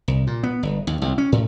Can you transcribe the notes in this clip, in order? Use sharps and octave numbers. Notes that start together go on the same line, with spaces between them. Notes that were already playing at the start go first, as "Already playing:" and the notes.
C2
A#2
B3
G1
D#2
C2
C#4
A2